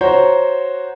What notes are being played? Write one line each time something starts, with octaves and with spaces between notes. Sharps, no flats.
F#4 C5 C#5 A#5